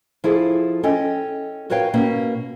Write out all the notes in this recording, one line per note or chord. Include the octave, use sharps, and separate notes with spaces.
F3 E4 G#4 A4
C#4 A4 D#5 G5
F#4 A#4 B4 C#5 F5 G5
B2 A#3 C#4